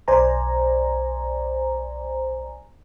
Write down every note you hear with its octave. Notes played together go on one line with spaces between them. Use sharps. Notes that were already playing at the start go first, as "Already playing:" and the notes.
B1 C5 D5 G#5 A#5